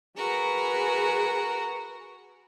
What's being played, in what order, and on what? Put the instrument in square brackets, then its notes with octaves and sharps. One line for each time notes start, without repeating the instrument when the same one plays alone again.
[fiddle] F#4 A#4 [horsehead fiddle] G#4 B4